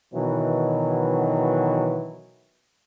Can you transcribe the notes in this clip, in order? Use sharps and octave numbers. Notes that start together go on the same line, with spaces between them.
B2 D#3 E3 F#3